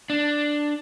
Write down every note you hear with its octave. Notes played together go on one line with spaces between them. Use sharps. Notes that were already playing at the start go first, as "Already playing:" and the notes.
D4